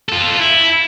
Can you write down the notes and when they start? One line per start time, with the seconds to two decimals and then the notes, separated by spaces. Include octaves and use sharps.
0.09 F4 A4
0.39 E4